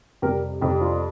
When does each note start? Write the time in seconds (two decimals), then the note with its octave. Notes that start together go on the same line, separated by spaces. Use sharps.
0.22 F2 C3 G3 G4 A#4
0.61 F2 C3 G3 D#4 G4
0.81 D4 F4